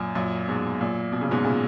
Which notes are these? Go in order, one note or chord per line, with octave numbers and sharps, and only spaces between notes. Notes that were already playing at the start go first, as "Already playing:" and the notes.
Already playing: F#2 A#2
F#2 A#2
G#2 B2
F#2 A#2
B2
C#3
G#2 B2
A#2 C#3